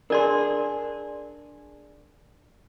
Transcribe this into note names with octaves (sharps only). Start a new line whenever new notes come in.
D4 G#4 A#4 D5 C6